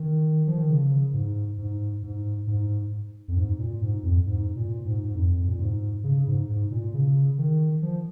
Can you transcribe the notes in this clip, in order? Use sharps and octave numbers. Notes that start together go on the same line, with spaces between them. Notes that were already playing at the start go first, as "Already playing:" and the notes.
Already playing: D#3
F3
D#3
C#3
G#2
G#2
G#2
G#2
F2
G#2
A#2
G#2
F2
G#2
A#2
G#2
G#2
F2
A#2
G#2
C#3
G#2
G#2
A#2
C#3
D#3
F3